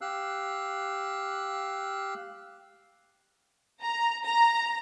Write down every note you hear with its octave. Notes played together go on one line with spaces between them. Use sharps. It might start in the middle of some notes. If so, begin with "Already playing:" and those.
G4 F5 E6 F#6
A#5
A#5